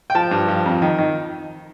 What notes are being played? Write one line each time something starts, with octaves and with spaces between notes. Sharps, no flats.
G5
F3 A5
G2
F3
F2
D#3
D#3